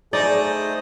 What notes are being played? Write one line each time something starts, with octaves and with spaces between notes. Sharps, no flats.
A3 D#4 G#4 C5 D5 D#6